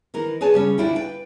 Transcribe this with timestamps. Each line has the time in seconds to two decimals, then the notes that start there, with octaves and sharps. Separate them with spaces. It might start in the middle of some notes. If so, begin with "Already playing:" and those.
0.14 D#3 E3 A#4
0.41 G#4 B4 C#5 G#5 A5
0.54 C#3 G3 C#4
0.78 D2 D4 E4 F4 G5
0.95 B4 G5